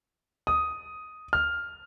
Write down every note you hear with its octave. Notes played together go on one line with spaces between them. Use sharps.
D#6
F6